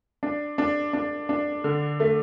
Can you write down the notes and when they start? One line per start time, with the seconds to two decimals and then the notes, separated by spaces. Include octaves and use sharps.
0.23 D4
0.58 D4
0.93 D4
1.29 D4
1.64 D3
2.00 A3